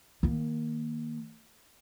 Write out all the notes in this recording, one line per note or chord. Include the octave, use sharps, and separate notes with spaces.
D#3 A#3